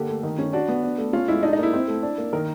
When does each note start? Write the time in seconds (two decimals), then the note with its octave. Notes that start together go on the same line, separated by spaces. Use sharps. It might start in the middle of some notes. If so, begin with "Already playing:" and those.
Already playing: D3 A#3 G4
0.09 A3
0.23 D#3
0.39 C#4
0.53 D4 F#4
0.68 B3
0.83 D4
0.98 A3
1.13 C#4 F4
1.28 G#3 E4
1.43 D4 D#4
1.53 D#4
1.59 A#3 E4
1.73 C4
1.88 A3
2.03 D4
2.18 A#3
2.33 D#3 A#4